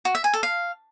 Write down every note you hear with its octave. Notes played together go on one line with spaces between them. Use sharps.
F#4
E5
G#5
A4
F5